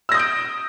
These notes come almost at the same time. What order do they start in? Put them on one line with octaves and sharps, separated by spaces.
E6 A#6 D#6 G6 D7